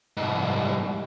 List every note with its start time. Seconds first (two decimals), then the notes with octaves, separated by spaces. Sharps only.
0.17 C2 G#2